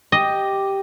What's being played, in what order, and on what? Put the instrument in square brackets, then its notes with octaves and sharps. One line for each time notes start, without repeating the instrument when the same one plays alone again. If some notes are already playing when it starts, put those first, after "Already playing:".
[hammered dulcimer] G4 [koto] D#5